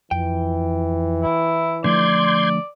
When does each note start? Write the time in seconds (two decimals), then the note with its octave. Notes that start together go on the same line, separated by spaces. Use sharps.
0.11 F2 E3 G5
1.23 E4
1.84 D3 F3 A3 D5 C6 G6 G#6